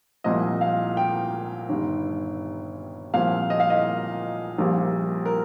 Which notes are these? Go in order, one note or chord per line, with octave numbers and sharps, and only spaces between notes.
C2 A#2 F3 D#5
F5
G5
G1 G2 D#3
C2 A#2 F3 F5
D#5
F5
D#5
A#1 A#2 G3
A#4